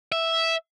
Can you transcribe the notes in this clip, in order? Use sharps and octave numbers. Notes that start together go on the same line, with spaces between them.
E5